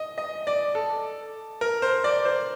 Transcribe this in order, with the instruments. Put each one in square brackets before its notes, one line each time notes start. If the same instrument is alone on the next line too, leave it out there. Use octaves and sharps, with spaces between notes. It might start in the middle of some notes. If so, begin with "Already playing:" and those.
Already playing: [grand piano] D#5
D#5
D5
A4
A#4
C5
D5
C5